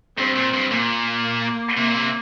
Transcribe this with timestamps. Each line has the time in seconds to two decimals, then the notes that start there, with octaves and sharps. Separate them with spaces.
0.17 G2 C4
0.36 A#2
0.53 G2
0.71 A#2 A#3
1.77 C3 A#3
1.88 A#2
1.95 C3